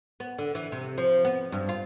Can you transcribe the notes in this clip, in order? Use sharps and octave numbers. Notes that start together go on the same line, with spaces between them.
B3
D3
E3
C3
F3
B3
G2
F4